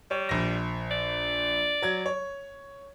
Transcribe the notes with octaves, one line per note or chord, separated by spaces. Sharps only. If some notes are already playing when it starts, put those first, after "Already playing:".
G3 C#5
A#1 A#6
D5
F#3 G#6
C#5